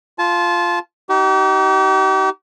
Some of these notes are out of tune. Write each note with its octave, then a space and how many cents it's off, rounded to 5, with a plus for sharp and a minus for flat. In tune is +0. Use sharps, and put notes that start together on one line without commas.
F4 +0 A5 -25
D#4 +5 G4 -40